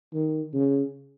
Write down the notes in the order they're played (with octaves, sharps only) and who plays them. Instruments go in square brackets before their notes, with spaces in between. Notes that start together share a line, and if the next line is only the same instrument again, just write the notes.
[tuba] D#3
C#3